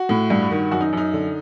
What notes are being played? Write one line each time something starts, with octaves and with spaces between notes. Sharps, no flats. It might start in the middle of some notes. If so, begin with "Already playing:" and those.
Already playing: F#4
A2
G2
D#3
F#2 F#4
D#4
F#2 D#4
D3